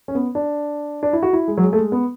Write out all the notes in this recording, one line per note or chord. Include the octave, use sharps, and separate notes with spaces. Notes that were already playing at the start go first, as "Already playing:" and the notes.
C#4
B3
D4
D4
E4
F#4
E4
G#3
F#3
G#3
A3
G#3
B3